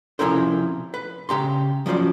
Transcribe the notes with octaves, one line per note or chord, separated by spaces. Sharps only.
C3 F3 C#4 E4 A#4 C5
B4
C#3 G4 A#5 C6
F3 F#3 C#4 C5 D5